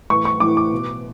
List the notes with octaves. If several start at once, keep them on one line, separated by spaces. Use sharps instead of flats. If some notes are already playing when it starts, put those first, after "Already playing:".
A2 E3 C#6
C#6
A2 E3 D6
D6
B2